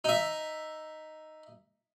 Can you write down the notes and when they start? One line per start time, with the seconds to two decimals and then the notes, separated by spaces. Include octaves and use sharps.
0.04 D#4 E5